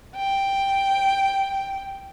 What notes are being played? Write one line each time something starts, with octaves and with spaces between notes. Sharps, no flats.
G5